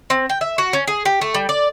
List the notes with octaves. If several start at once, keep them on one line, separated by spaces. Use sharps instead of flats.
C4
G5
E5
F#4
C#4
G#4
G4
A3
G3
D5